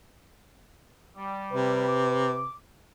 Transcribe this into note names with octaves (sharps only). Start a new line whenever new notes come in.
G3
C3 B4
D6